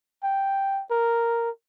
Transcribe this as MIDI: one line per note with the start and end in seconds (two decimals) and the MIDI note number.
0.23 0.82 79
0.91 1.50 70